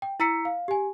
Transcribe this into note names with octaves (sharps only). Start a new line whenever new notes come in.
G5
E4 A#5 E6 B6 C#7
F5
G4 G#5